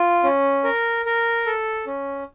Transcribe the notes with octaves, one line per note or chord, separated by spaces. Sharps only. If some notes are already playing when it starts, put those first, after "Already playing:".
Already playing: F4
C#4
A#4
A#4
A4
C#4